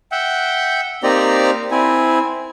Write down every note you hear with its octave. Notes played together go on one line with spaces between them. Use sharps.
E5 F#5 G5
A#3 C4 D#4 G4 D5 A#5
C4 E4 G#5